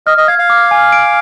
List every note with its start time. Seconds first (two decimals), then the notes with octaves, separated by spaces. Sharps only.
0.07 D#5 F6
0.18 D#5
0.28 F5 G#6
0.39 F5
0.50 D6
0.71 G#5
0.92 D7